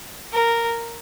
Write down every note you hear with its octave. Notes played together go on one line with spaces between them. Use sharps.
A#4